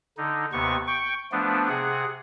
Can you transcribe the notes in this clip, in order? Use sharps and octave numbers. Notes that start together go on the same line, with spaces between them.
D3 D#4
D#2 C3 B3 C#6
G5 C#6
F3 A3 B3 D4
C3 G#4 F#5